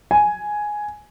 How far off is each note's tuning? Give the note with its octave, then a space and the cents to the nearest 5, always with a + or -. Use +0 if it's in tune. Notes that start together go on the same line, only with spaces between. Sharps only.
G#5 +5